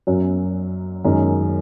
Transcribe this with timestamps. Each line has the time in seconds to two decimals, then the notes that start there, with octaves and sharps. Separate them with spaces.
0.07 F#2 F#3 C#4
1.05 F#2 D#3 G#3 C#4